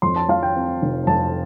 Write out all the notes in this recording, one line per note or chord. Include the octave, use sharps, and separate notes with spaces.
F2 C6
A5
F3 F5
G5
C4
F1
F2 A5